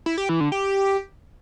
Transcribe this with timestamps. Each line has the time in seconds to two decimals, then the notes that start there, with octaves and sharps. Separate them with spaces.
0.06 E4
0.18 G4
0.29 E3
0.40 D3
0.52 G4